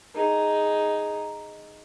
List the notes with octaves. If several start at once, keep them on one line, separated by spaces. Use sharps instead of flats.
D#4 G#4